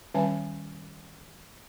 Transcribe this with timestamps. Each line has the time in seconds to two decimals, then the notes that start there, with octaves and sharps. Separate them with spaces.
0.14 D#3 G3 C#4 B4 G#5 A5